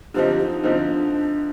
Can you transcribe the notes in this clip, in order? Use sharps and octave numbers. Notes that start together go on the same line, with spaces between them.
D3 F3 C4 D#4 G4
D#4
D3 F3 C4 D4 D#4